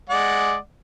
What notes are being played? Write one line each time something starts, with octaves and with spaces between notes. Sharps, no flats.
G#3 D5 F#5